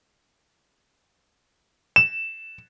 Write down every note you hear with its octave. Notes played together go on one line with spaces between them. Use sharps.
E7